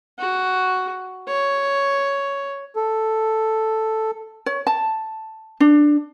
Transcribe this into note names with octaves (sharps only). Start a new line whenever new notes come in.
F#4
C#5
A4
C#5
A5
D4